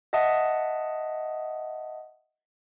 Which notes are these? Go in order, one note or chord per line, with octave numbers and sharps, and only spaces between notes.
D#5 E5 F#5 A5 D#6